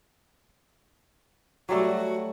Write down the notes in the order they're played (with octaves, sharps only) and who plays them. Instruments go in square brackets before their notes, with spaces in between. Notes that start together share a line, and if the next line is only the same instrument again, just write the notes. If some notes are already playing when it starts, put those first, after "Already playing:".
[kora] F#3 G3 A3 [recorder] F#4